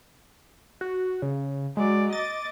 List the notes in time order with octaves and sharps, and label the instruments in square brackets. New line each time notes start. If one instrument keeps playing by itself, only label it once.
[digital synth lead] F#4
C#3
[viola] F#3 D5 [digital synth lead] G#3
[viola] D#5 D6 [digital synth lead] A6